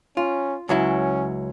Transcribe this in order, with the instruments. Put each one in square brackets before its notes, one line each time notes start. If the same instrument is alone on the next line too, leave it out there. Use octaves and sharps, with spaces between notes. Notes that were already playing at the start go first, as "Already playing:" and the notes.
[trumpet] C#4 [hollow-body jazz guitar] F4
[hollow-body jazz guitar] C#2 F#3 E4 [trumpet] C#4